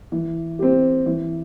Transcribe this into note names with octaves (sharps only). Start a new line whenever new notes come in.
E3
C4 G4
E3